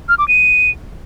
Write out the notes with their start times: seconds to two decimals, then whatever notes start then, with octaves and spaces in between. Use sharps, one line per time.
0.09 F6
0.18 D6
0.28 D#7